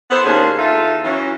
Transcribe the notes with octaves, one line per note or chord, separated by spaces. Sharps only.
B3 E4 A4 C5
D#2 A#2 C#4 D4 G#4 C5
E2 D#4 F4 A4 E5
E3 F#3 C#4